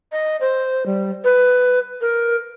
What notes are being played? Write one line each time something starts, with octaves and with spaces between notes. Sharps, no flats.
D#5
C5
G3
B4
A#4